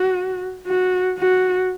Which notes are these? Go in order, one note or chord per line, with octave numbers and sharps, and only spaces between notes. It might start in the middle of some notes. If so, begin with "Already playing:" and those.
Already playing: F#4
F#4
F#4